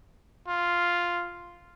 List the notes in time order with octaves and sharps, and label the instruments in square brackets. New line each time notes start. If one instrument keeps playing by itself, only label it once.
[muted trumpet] F4